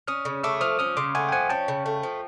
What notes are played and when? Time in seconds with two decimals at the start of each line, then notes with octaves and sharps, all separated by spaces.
0.07 C#4 D#6 F6
0.25 C#3
0.44 A3 D6 E6
0.61 F3 D#6 F6
0.79 C#4 D#6 F6
0.97 C#3 C6 D6
1.15 A3 F#5 G#5
1.29 G5
1.32 F3 F#5 G#5
1.50 C#4 G5 A5
1.68 C#3
1.86 A3
2.03 F3